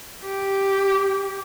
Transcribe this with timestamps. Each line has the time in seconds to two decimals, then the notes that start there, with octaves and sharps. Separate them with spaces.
0.25 G4